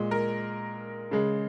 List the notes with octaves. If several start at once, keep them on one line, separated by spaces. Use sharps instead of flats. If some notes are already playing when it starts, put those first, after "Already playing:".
Already playing: A#2 G#3
A#4
C#3 G#3